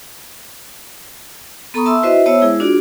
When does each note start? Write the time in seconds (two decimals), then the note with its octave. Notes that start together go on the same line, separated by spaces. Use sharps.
1.74 B3 A4 A#5 B5 C#6 D#6
1.86 E5 A5 C6 E6
2.03 E4 F#4 B4 C5 D#5 E5
2.26 B3 C5 C#5 E5 A5 E6
2.41 G#3 E4 G#4
2.60 D4 F4 F#4 G#4 D5